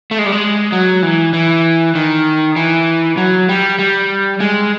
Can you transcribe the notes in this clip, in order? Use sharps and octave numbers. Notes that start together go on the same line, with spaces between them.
A3
G#3
G3
G#3
F#3
E3
E3
D#3
E3
F#3
G3
G3
G#3